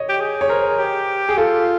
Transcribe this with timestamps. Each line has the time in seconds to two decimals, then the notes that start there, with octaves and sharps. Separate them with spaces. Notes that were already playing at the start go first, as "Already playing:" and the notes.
Already playing: C#5 D#5
0.09 G4
0.20 G#4
0.41 C#5
0.49 A#4 C5
0.79 G4
1.29 G#4
1.37 F4 A4